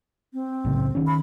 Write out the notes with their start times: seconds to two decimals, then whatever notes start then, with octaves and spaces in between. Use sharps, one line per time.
0.34 C4
0.65 B1 A2 C#3
0.95 D#3 C#4
1.07 B5